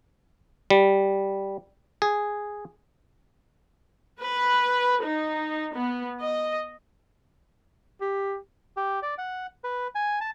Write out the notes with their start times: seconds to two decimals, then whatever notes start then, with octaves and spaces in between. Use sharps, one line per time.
0.70 G3
2.02 G#4
4.22 B4
5.05 D#4
5.74 B3
6.23 D#5
8.01 G4
8.77 G4
9.03 D5
9.18 F#5
9.64 B4
9.95 G#5
10.21 A5